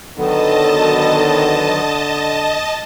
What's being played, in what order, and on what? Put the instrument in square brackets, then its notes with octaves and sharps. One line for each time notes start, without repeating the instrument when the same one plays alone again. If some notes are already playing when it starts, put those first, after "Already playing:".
[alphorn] D3 [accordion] D#3 F#3 B3 [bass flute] A4 [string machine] D#5 A5